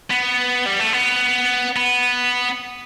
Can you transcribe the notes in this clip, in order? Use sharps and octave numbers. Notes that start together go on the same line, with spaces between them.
B3
G3
A3
B3
B3